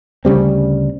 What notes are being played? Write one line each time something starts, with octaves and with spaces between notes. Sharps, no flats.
D2 C#3 G3 C4